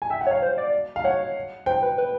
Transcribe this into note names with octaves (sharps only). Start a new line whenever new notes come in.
G#5
E5 G5
F#5
C#5
F5
C5
D5
F5
C#5 F#5
C5 G5
B4
B4